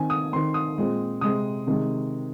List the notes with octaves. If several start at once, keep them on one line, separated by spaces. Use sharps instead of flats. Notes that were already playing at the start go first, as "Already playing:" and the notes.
Already playing: D#3 C4 G#5
D#6
D#3 C4 C6
D#6
A#2 G#3 C4
C3 G#3 C4 D#6
C3 D#3 G#3